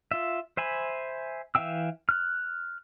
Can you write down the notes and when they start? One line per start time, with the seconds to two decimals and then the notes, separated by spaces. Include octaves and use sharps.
0.11 F4 E5
0.57 C5 E5 G#5 B5
1.55 E3 E5 F5 G5 E6
2.09 F6 F#6